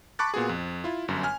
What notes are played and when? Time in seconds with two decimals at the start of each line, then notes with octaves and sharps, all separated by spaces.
0.19 A5 B5 C#6 D6 F#6 A6
0.34 A#2 B3 F#4 G#4
0.49 F2
0.84 E4 F4
1.08 G1 F#2
1.23 G#5 F6